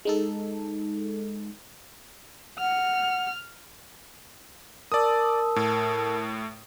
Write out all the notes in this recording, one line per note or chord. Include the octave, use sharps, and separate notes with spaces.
G#3 D#4 A4
F#5 F6
A#4 D5 A5 D#6 E6
A2